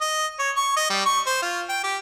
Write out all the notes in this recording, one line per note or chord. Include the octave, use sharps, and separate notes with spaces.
D#5
C#5
C#6
D#5
G3
C#6
C5
F4
G5
G4